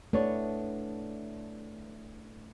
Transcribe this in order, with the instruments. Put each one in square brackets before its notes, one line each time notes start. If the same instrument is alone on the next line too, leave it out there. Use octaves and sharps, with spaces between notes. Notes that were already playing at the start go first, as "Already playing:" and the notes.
[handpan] A3 [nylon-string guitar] B3 D4 C#5